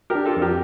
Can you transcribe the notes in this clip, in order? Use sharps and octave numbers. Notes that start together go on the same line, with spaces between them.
G4 A#4
D4
F4 A4
F2
G4 A#4